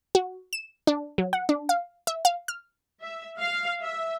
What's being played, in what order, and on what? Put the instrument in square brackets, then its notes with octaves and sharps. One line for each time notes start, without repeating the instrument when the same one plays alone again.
[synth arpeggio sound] F#4
E7
D4
F#3
F#5
D4
F5
E5
F5
F6
[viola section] E5
F5
E5